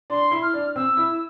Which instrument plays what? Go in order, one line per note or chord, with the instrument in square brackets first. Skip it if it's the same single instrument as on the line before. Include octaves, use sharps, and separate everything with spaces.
[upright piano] D4 [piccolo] C6
[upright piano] E4
[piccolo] F6
[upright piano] D4
[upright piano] C4 [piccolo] E6
[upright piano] E4